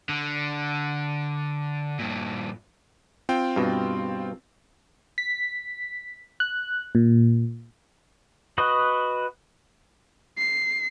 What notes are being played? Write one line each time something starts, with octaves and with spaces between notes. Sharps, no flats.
D3
G2 A#2
C4 F4 G5
G2 B2
B6
F#6
A#2
F#4 B4 D#5
C7